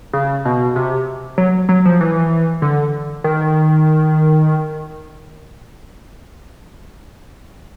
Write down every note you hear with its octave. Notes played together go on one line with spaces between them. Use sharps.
C#3
B2
C3
F#3
F#3
F3
E3
D3
D#3